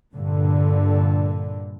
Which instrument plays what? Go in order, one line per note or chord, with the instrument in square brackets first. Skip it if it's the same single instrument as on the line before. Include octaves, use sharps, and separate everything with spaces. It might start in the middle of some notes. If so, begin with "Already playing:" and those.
[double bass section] G2 A#2 D3